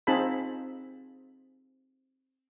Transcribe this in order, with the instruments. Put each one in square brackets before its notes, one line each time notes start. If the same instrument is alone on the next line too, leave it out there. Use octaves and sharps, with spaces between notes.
[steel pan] C4 D#4 F4 G#4 A5 B5